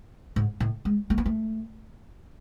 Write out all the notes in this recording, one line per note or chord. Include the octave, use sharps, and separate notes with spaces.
G#2
A2
G#3
A3
B3
A3